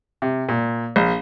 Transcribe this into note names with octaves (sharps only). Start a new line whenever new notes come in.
C3
A#2
A#1